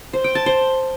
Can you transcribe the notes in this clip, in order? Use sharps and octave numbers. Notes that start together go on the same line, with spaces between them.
C5
G5
A5
C5